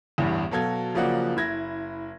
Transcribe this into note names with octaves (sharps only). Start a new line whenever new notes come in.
A1 E2 G2
B2 F#3 A4 F5 G#6
C#3 F3 F#3 A#3 D5 F#5
F#1 E4 G#6 A#6